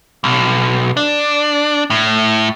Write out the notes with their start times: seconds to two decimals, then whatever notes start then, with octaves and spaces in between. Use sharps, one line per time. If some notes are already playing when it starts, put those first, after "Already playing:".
0.24 B1
0.97 D4
1.90 A2